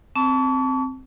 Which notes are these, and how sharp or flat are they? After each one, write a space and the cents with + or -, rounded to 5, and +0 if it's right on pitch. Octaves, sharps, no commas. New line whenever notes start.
C4 +0 A5 +0 C#6 +45